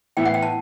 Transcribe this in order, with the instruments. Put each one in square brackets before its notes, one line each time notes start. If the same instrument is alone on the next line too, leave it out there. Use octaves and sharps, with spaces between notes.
[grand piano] A2 E3 B3 E4 [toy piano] G5
[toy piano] F#5
G5
A5